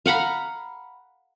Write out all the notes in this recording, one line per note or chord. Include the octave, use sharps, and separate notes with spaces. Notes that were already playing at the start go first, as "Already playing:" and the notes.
F5 F#5 A#5 B5